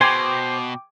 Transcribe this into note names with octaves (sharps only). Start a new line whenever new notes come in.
B2 C5 G5 G#5 C6 D6